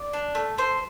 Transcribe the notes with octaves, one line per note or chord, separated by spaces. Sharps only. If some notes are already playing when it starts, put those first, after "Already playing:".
Already playing: D5
D4
A3
A3 C5